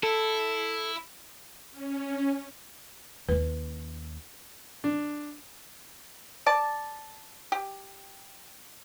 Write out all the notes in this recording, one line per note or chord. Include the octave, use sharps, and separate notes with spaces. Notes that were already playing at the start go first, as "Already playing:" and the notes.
E4 A4
C#4
D#2 C#4 B4
D4
D5 A5
G4